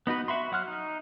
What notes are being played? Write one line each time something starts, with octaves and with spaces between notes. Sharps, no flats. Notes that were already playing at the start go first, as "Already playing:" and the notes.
B3 D#4 F#4 B4
F#4 E5 B5 C6
F#3 F#5 F6 F#6
D#4